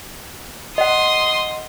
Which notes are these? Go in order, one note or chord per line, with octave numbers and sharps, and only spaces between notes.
D#5 F#5 C6 D#6